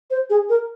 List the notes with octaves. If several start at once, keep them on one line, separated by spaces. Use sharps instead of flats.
C5
G#4
A#4